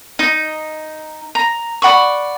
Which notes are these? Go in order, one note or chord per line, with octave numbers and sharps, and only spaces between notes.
D#4
A#5
D5 F#5 B5 C#6